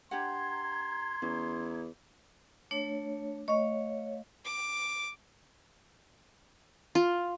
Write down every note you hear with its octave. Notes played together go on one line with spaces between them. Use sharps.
D4 G4 F#5 A#5 C6 G#6
E2 C#4
A3 D4 C#5
A3 C#5 D#5 F5 C#6
D6
F4